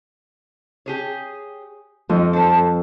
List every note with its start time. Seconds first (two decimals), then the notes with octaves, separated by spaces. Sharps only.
0.86 G4 G#4 C#5
2.09 F2 D#4
2.33 A4 C5